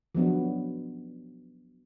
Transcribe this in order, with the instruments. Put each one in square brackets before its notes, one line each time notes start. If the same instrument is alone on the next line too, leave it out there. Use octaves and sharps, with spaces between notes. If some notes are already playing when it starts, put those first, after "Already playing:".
[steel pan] F3 F#3 B3 D4